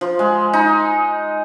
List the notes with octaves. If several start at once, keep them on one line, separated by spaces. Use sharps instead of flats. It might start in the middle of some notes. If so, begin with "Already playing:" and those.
F3
G#3
D#4